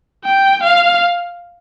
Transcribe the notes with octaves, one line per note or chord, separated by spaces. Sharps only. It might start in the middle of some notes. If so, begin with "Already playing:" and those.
G5
F5